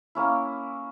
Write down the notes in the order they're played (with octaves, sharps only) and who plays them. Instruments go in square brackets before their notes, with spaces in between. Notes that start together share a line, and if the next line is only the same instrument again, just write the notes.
[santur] A#3 C#4 E4